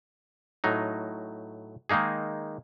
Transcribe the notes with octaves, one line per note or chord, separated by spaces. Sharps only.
A2 F#3 D#4
D#3 G#3 A#3 D#4 G#4